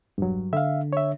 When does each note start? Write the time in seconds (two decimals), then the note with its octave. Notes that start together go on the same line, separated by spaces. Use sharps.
0.18 E1 G2 F#3
0.53 D3 E5 F5
0.93 C#5 E5